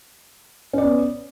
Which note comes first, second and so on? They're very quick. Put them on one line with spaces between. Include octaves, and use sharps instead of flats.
C#4 D5 B3